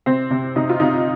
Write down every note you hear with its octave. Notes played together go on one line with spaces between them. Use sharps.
C3 C4
C3
C3 D#4
F4
C3 D#4